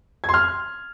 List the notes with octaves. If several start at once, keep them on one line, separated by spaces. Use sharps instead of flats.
G#6
C6
F6